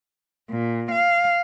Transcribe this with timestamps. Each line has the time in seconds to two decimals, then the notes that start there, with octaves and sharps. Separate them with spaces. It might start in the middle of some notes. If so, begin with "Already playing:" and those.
0.50 A#2
0.91 F5